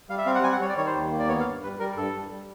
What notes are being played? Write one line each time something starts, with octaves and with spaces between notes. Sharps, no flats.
G3 F5
E5
C4 F5
F#5
G3 G#5
F#5
G3 C#5
D5
D#3 C#5
C5
D#2
A#3
D5
B3 C#5
F5
G2
G3 B4
G3 A#4
G2 A4
G3
G3